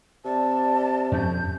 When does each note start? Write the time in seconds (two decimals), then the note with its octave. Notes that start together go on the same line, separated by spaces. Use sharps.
0.25 C3 D5 A5
1.12 F2 C#4 G6